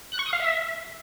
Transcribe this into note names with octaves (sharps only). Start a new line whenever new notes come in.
F#6
C#6
D#6
F5
E5